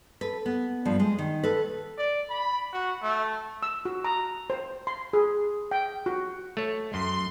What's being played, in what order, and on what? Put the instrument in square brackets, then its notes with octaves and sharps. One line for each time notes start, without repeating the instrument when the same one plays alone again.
[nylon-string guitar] A4 B4
B3
G2 F3 B3
G#3
D#3
A4 B4
[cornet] D5
B5
F#4
A3
[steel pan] E6
F#4
A#5
C5
C6
G#4
G5
F#4
[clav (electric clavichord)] A3 C#5
[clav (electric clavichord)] F#2 [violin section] C6